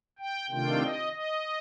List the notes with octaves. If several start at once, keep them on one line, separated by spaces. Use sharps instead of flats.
G5
C3 D#3 A3 D4 F4 G5
D#5
D#5